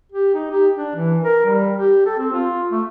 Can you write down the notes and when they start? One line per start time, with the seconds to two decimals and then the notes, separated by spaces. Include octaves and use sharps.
0.12 G4
0.34 D#4
0.51 G4
0.77 D4
0.95 E3
1.24 A#4
1.46 G3
1.76 G4
2.06 A4
2.19 C4
2.33 F4
2.71 A3